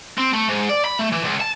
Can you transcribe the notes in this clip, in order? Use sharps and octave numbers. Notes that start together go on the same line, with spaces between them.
C4
A3
G#2
D5
B5
A3
E3
C#2
A5